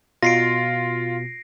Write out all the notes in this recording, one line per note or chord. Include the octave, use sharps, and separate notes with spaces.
B2 F4 A#6 C7 D7